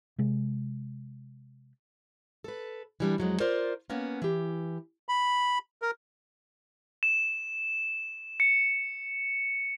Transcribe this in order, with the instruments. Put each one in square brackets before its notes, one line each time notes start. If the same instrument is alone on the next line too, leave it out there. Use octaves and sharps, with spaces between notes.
[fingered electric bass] C3 G#3
[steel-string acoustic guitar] A4 B4
E3 G3 D4
F2 F#3 G#3
F4 A#4 C5 D5
A#3 B3 C#4
E3 G4
[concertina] B5
A#4
[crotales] E7
C#7